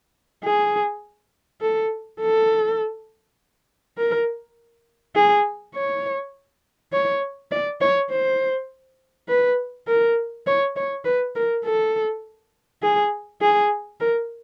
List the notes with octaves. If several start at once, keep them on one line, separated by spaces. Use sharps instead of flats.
G#4
A4
A4
A#4
G#4
C#5
C#5
D5
C#5
C5
B4
A#4
C#5
C#5
B4
A#4
A4
G#4
G#4
A#4